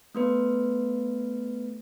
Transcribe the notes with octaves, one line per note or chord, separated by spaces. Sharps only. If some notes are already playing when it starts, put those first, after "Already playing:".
A3 B3 B4